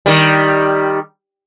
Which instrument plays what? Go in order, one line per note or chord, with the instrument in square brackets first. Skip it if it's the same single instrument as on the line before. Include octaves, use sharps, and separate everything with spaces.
[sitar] D#3 G3